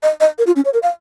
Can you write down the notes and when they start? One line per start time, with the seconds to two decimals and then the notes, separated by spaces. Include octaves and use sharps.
0.03 D#5
0.20 D#5
0.38 A#4
0.47 F4
0.56 C#4
0.65 C#5
0.74 A#4
0.83 F5